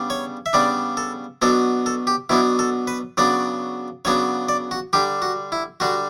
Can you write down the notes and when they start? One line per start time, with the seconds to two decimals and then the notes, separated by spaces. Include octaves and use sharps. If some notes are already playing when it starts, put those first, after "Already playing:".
Already playing: C#3 G3 B3 D4
0.10 C#5
0.46 E5
0.53 C#3 G3 B3 D4 D5
0.97 A4
1.42 B2 F#3 B3 D4 A4
1.86 A4
2.07 G4
2.29 B2 F#3 B3 D4 E4
2.59 A4
2.87 B4
3.17 C#3 F#3 B3 D4 D5
4.05 C#3 F#3 B3 D4 C#5
4.49 D5
4.71 F#4
4.93 D3 G3 D4 G4
5.22 F#4
5.52 E4
5.80 D3 G3 D4 F#4